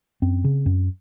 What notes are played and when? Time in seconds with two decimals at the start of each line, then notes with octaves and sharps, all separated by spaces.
0.22 F#2 C4
0.44 C#3
0.66 F#2